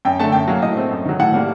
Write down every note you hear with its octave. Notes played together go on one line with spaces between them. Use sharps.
F#2 G5
D3 A3 A5
F#2 G5
F#3 A#3
A2 D#5
A3 C4
F#2
D#3 F#3
A2 F#5
G3 A#3